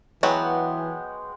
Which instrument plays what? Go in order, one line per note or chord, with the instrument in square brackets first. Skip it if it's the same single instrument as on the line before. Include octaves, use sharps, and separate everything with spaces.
[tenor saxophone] E3 [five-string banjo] F#3 B3 F#4 [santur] G#3 F#5 G5